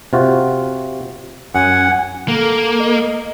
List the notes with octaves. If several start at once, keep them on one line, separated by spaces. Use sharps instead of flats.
C3 F4 F#4
F#2 F#5 G#5
A#3 A4
D#5